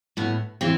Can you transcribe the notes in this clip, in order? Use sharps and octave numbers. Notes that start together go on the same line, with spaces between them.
A2 B3
E3 C4